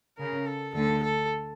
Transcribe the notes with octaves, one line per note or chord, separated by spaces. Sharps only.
C#3 A#4
A4
D2 D3 A4
A4